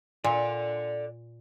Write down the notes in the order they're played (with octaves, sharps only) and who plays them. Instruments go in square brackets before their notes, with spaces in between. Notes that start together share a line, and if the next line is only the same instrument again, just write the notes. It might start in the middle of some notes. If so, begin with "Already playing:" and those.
[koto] A#2 [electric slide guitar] A4 D5